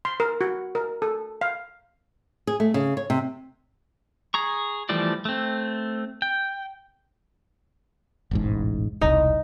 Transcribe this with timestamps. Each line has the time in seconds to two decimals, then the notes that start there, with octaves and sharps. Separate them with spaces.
0.05 C6
0.20 A#4
0.41 F#4
0.75 A#4
1.02 A4
1.41 F5
2.47 G#4
2.60 A3
2.74 C#3
2.97 C#5
3.10 C3
4.34 G#4 A#5 C#6
4.89 E3 F3 G3 A3 D5
5.25 A3 C4
6.22 G5
8.31 E1 A1 G#2
9.01 E1 C2 D#4